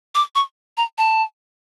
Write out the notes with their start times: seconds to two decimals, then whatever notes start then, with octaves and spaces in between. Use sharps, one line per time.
0.15 D6
0.35 C#6
0.77 A#5
0.98 A5